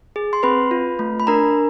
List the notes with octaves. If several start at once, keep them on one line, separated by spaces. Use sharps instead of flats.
G#4
C6
C4 B4 B5
F4
A3
B5
D4 A#4 A#5